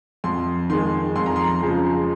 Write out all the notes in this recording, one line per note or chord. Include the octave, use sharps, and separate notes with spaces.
F2 C6
D#3 G#3 C6
F2 C6
A#5
C6
C#3 F3 G#3